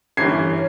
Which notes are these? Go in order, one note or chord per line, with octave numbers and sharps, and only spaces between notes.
G1 G2 E3 G#6 C7
C#4